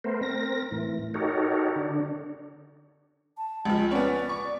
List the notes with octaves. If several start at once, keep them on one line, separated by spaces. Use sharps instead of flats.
A3 B3 A#4 C5
C4 A#4 A#6
A2 E3
D#4 F#4 G4 A4 A#4 C#5
D3 D4
A5
C#2 F3 G#3
B3 C#4 D5
C#6